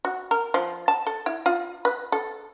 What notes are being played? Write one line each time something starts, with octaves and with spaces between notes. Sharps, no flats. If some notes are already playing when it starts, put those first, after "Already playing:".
F#4
A#4
F3
A5
A4
E4
F4
B4
A4